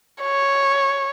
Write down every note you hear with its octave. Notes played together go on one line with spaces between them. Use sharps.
C#5